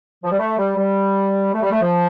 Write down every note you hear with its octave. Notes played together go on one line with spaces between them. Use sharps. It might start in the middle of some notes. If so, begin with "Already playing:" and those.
F3
G3
A3
G3
G3
A3
G3
A3
F3